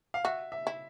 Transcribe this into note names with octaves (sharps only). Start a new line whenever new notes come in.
F5
F#4 E5
E5
E4